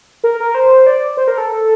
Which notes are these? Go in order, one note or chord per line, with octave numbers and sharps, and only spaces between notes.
A#4
A#4
C5
D5
C5
A#4
A4